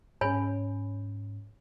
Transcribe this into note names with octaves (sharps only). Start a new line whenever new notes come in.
G#2 C#4 C#5 G#5 B5